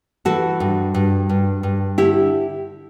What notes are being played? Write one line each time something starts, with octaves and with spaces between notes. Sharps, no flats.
E3 F#4 A4
G2
G2
G2
G2
D3 E4 G4